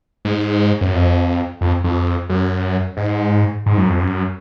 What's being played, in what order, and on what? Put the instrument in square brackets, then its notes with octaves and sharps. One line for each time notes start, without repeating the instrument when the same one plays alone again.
[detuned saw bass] G#2
F#2
F2
F2
F2
F#2
G#2
G#2
F#2
F2
F#2